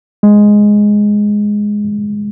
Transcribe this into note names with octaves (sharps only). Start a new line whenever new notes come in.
G#3